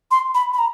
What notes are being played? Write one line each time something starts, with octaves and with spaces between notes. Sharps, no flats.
C6
B5
B5
A#5